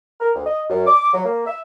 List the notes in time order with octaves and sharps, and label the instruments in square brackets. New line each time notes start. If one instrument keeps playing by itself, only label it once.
[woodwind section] A#4
D2
D#5
F#2
D6
F#3
A#3
E5